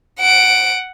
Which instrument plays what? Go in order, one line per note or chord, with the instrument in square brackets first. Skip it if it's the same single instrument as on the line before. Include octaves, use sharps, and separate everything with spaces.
[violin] F#5 D7